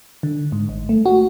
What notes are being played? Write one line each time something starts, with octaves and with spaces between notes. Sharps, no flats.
D3
G#2
G#1
A3
F#4